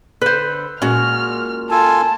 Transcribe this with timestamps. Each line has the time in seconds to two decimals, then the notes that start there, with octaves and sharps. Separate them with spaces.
0.21 D3 B4 C5
0.82 A#2 G#3 C#4 F#4 F6
1.71 F4 A4 G#5 A5